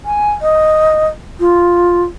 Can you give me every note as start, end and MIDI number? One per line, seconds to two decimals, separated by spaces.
0.05 0.31 80
0.41 1.07 75
1.40 2.02 65